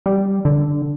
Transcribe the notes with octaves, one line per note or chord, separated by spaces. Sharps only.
G3
D3